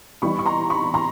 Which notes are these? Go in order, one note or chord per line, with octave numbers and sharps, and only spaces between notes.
E3 G3 B3 D#4 B5 C#6
C#6
A#5 C6
B5 C#6
A#5 C6